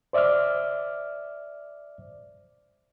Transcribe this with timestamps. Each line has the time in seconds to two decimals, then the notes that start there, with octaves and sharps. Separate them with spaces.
0.13 C5 D5 E5 D6 F6